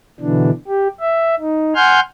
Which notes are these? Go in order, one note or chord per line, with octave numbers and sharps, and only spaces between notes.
B2 D3 E3 D4
G4
E5
D#4
F#5 G#5 C6 F6 G6